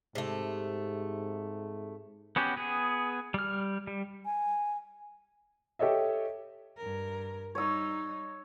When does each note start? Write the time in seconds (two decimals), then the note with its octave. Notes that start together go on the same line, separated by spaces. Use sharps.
0.15 G#2 C3 A3
2.36 B3 C#4 F#4 G4
2.57 B3 G#4
3.34 G3 F6
3.87 G3
4.25 G#5
5.79 G4 A4 C#5 D#5 E5
6.77 G2 A#4
7.55 G3 D#4 C#5 E6